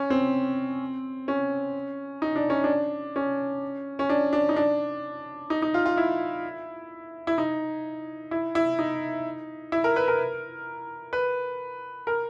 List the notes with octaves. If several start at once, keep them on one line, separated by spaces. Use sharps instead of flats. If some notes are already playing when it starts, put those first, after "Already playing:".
Already playing: C#4
C4
C#4
D#4
D4
C#4
D4
C#4
C#4
D4
D4
D#4
D4
D#4
D#4
F4
F4
E4
E4
D#4
E4
E4
D#4
E4
A#4
B4
A#4
B4
A#4